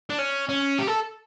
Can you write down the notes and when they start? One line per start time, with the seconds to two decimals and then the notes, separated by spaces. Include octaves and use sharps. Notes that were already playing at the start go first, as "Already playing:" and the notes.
0.10 D4
0.19 C#4
0.49 C#4
0.78 G4
0.87 A4